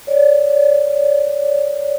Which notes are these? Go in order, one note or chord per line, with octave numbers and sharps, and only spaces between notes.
C#5 D5